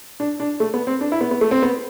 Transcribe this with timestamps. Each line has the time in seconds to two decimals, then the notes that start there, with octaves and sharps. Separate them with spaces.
0.20 D4
0.40 D4
0.60 A3
0.74 B3
0.87 C4
1.01 D4
1.12 E4
1.21 B3
1.31 B3
1.41 A3
1.51 C4
1.63 B3